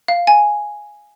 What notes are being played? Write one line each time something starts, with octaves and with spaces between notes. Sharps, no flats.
F5
G#5